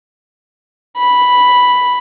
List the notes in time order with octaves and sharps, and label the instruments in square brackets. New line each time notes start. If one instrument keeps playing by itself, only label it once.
[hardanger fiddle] B5